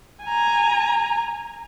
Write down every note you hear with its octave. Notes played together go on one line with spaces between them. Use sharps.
G#5 A#5